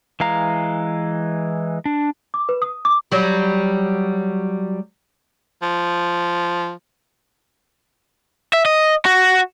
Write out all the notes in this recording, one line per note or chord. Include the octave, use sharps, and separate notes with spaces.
E3 G#3 F5 A#5
D4
D6
B4
D#6
D6
F#3 G3
F3
E5
D#5
F#4